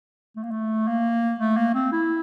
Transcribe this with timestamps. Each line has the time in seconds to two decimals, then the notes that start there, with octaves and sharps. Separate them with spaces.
0.36 A3
0.43 A#3
0.51 A3
0.88 A#3
1.40 A3
1.57 A#3
1.74 C4
1.92 E4